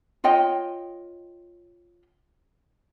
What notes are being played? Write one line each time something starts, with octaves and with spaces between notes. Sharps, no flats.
F4 C#5 D#5 G5